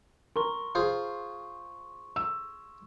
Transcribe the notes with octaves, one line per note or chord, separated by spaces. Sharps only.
A#4 C6 C#6
F4 G#4 C5
E6